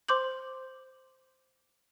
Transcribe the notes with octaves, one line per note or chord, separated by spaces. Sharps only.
C5 C6 D6 G6 F#7